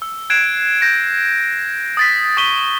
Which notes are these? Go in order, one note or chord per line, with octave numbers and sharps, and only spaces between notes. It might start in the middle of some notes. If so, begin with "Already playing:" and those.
E6
F#6 G#6 C7 D7 E7
G6 A#6 D7
D#6 A6 B6
C#6 D#6 A6 B6 D#7 G7